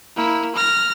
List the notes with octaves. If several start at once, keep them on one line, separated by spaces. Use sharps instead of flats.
A#3 E4
F6 A#6